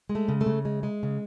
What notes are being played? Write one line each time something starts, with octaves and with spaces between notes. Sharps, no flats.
G#3
A3
C#3
A3
C#3
G#3
G#3
C#3